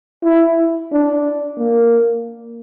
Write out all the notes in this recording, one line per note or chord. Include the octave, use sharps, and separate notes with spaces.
E4
D4
A#3